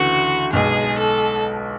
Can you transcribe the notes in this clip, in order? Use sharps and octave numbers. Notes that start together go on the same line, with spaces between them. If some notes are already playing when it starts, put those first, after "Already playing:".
Already playing: D2 C#3 E3 A3 F#4
B1 B2 G#3 G#4
A4